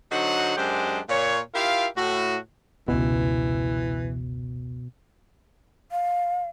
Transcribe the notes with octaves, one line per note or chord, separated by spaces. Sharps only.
D3 F#3 D#4 F#4 C5 F#5
F#2 G#3 D4 G4 C5
A#2 C#5
E4 F4 G4 A#4 F5
A2 F#4
F1 C#2 B2 E3
F5